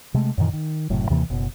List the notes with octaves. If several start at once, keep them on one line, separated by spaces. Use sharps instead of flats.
C3 G#3 A3
F#2 A#2 D#3 E3
D#3
F#1 F#2 A2 C3
D#2 C3 E3 A#3
F#1 B2